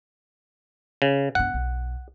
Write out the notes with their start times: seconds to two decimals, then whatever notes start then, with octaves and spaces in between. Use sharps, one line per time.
1.02 C#3
1.35 G2 B3 F#5
1.54 B1